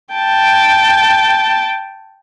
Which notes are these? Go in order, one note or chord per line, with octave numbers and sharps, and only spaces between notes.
G5 A5